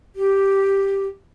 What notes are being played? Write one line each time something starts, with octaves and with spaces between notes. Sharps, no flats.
G4